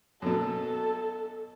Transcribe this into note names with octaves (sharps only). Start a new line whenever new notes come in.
F#2 B2 A4